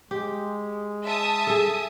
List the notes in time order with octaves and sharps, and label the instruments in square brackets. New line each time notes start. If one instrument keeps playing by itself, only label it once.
[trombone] G#3 [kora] G4
[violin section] E5 A5 D#6
[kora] G#4 A4